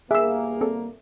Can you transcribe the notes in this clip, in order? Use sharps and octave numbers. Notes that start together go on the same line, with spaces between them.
G1 A#3 G#4 E5 D6 E6 C7
C4 A4 D5